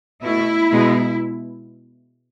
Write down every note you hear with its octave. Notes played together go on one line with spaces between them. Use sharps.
B2 A3 E4
B2 G#3 B3